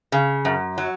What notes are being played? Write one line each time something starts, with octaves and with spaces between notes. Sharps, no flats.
C#3
F#2
F#3